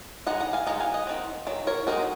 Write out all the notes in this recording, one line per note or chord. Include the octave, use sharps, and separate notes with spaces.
G#3 D#4 D#5 F#5
F#5 A#5
F5 G#5
G#3 D#4 F#5 A#5
F5 G#5
D#5 F#5
D#3 F#3 C4
D#3 F#3
A#4 C#5
G#3 C4 D#4 F#4 A#4